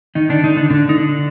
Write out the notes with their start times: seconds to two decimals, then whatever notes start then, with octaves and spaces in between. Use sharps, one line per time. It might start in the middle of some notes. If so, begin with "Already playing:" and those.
0.15 D#3 D#4
0.29 D3 D4
0.43 D#3 D#4
0.57 D3 D4
0.70 D3 D4
0.89 D#4
0.98 D3 D4